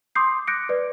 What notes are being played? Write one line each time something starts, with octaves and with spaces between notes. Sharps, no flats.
C6 D6 D#6 G6 C7
D6 F#6 G6 A#6 C#7 D7
B4 D5